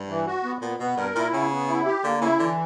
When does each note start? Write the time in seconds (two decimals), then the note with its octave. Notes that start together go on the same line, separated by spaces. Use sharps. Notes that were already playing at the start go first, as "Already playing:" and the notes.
Already playing: G2
0.09 E3
0.26 F#4
0.44 B3
0.61 A#2 B3
0.80 B2 B3
0.97 G2 A#4
1.15 A#2 E4
1.33 C#3 B3
1.51 B3
1.68 E4
1.86 G4
2.04 D3 A#3
2.21 C#3 E4
2.39 D3 E3